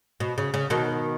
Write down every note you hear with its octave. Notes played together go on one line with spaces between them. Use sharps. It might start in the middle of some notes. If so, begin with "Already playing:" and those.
B2
C#3
C#3
B2 D#3